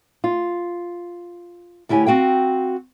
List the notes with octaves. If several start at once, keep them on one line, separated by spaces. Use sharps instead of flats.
F4
D2 E4 G4 C#5 G#5
C4 F#4 F5 G5